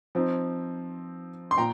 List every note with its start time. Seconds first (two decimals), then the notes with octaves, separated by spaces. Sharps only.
0.15 F3 C4 D#4
1.51 C6
1.58 A#2 G5 A#5